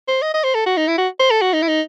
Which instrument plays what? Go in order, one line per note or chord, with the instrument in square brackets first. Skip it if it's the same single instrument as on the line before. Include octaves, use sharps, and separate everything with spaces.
[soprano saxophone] C5
D#5
D#5
C5
A4
F#4
D#4
E4
F#4
C5
A4
F#4
D#4
E4
D#4